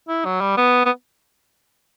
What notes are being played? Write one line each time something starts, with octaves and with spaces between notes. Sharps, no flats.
E4
F#3
G3
B3
B3